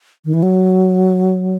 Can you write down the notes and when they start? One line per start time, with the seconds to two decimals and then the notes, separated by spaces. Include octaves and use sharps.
0.25 D#3
0.34 E3
0.43 F#3